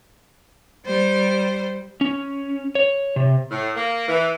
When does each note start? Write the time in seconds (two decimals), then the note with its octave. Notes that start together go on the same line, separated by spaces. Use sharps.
0.85 G3 C5
2.01 C#4
2.75 C#5
3.16 C3
3.50 A2
3.75 A#3
4.08 E3